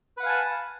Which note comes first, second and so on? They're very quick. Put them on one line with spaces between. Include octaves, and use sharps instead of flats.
B4 F#5 F5 G#5 A5